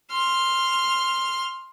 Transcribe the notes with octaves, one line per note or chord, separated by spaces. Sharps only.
C6 F6